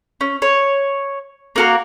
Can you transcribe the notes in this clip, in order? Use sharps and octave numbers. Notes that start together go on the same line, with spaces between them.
C#4
C#5
A#3 F#4 A#4